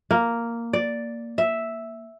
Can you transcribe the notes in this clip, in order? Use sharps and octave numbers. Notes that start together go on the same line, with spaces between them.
A#3
D5
E5